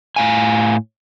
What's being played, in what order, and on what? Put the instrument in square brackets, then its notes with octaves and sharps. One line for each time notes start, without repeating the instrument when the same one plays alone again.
[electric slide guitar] A2 F5 G#5